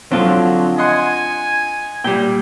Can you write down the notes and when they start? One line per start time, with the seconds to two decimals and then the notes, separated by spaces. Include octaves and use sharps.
0.12 D3 F3 F#3 C4 D4 F4
0.78 D#5 F#5 G#5 C6
2.04 A#2 G3 G5